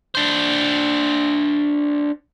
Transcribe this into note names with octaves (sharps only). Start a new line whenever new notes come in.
D4 C5